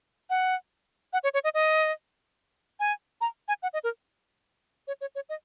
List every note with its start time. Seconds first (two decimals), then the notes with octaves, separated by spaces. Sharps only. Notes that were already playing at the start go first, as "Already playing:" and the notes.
0.30 F#5
1.13 F#5
1.24 C#5
1.34 C#5
1.44 D#5
1.54 D#5
2.80 G#5
3.21 A#5
3.48 G#5
3.63 F#5
3.73 D#5
3.84 A#4
4.88 C#5
5.01 C#5
5.15 C#5
5.29 D#5